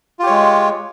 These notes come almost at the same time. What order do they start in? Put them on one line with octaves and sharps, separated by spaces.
F4 G4 C#5 G#3